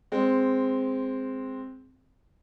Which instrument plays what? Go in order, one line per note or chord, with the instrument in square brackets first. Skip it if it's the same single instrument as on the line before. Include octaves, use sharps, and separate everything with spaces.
[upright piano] G#3 C4